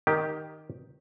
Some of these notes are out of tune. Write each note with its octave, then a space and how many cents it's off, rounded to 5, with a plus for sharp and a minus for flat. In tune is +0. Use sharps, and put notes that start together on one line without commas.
D#3 +0 G4 +0